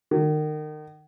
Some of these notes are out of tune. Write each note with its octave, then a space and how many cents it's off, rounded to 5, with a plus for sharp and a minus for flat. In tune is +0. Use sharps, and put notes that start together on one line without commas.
D#3 -30